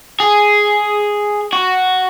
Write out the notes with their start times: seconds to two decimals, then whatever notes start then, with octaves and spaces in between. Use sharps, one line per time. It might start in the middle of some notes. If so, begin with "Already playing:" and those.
0.20 G#4
1.53 F#4